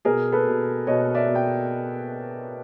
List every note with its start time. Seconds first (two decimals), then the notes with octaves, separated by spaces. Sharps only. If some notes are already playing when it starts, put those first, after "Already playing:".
0.05 B2 G#4 A#4
0.32 A4 B4
0.46 B2
0.87 B2 C#5 D#5
1.15 D5 E5
1.28 B2
1.35 G5